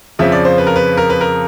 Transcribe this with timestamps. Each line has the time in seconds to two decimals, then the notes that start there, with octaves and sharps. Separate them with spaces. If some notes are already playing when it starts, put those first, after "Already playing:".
0.19 F2 C#3 F3 E5
0.32 D5
0.45 C5
0.58 B4
0.67 A#4
0.76 B4
0.97 A#4
1.10 B4
1.21 A#4